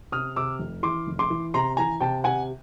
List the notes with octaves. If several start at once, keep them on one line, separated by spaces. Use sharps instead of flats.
C3 D#6 F6
C3 D6 E6
F1
E3 C6 D6
F1
C6 D6
E3
C3 A#5 C6
E3 G#5 A#5
C3 G5 A5
C3 F#5 G#5